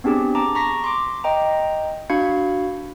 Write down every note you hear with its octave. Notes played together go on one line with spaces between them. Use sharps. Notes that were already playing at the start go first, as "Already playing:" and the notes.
B3 C4 D4 G4 G#4
A5 A#5 D6
A#5 C#6 A#6 B6
C6 D6
D#5 G5 A#5
D4 F#4 F5 B5 G#6 C#7